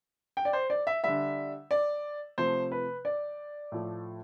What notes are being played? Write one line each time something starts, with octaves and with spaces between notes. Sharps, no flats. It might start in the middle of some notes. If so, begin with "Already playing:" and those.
G5
D5
C5
D5
E5
D3 G3 E5
D5
C3 F3 A3 C5
B4
D5
A2 F3 A3